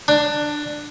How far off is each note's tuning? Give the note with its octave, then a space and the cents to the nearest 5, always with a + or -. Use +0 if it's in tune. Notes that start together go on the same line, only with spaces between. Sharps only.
D4 +15